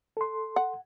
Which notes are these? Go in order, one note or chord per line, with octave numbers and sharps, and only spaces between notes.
A4 C6
F#5